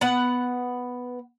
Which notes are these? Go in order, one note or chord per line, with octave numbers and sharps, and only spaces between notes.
B3 F#5